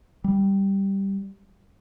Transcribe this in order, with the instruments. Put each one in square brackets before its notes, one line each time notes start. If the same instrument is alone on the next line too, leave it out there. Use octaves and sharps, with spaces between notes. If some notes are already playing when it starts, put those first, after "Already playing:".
[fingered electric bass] G3